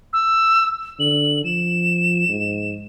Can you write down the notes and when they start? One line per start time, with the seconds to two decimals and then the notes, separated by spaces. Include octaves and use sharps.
0.13 E6
1.00 D3 F#7
1.44 F3 E7
2.29 G#2